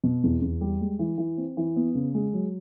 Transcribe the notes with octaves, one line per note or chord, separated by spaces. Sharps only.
B2
E2
E2
G3
G#3
E3
E3
C4
E3
B3
C#3
G#3
F#3